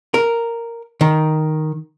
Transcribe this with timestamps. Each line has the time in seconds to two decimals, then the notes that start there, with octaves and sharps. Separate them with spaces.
0.14 A#4
1.01 D#3